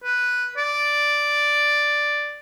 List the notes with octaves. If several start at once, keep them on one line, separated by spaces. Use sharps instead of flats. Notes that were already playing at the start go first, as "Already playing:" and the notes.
B4
D5